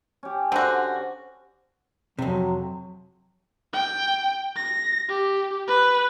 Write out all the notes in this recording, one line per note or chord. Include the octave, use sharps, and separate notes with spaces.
C#4 G4
D3 F#4 C5
F2 C3 F#3
G5
A#6
G4
B4